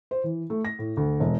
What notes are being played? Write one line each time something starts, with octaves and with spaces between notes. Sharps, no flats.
C5
E3
A3
A#6
A2
D2
E1